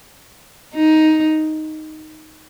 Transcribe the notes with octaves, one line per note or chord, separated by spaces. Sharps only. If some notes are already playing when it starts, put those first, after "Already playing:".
D#4